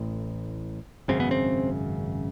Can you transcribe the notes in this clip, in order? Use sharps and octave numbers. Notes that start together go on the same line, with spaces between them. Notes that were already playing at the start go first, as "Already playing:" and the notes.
Already playing: A1 A2
G#1 F#2 C#3 C4
B3
C4